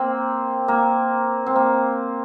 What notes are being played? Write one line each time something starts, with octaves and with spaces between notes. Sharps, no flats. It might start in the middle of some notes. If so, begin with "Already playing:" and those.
Already playing: A#3 C4
A#3
C4
A#3